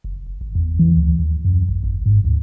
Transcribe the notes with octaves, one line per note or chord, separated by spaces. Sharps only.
F#1
G#1
E2
E3
D2
D#2
F#2
A1
G#1
G#2
D2